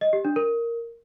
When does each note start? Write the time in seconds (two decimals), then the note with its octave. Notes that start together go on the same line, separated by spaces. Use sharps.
0.01 D#5
0.13 G4
0.25 D4
0.36 A#4